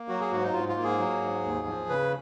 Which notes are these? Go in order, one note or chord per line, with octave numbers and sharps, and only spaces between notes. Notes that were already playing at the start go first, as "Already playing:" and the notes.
Already playing: A#3
F#3 F#4
G#4
G#2 F#4
D#4
G#2 F4
F4
A#3
G#4
F#3
G#2
D#2
F3
C#3 B4